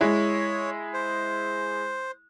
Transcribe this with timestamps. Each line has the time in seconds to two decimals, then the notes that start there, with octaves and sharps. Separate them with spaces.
0.01 G#3 E4 C#5
0.94 C5